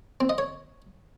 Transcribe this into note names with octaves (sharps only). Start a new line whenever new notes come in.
C4
D#5
C#5